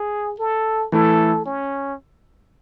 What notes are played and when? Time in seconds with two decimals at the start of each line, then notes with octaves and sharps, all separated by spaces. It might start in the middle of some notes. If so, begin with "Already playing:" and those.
Already playing: G#4
0.39 A4
0.92 E3 A3 E4 A4
1.46 C#4